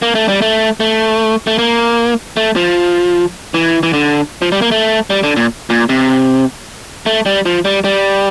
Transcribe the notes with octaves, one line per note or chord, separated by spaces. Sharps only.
A#3
A3
G3
A3
A3
A3
A#3
A3
F3
E3
E3
D3
F3
G3
A#3
A3
G3
D3
A#2
A#2
C3
A3
G3
F3
G3
G3